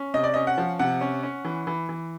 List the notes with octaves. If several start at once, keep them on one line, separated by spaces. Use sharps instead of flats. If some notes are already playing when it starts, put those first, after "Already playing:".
Already playing: C#4
C3 D#5
D5
C#4 D#5
F#5
F3
C3 F#5
C#4
C#4
E3
E3
E3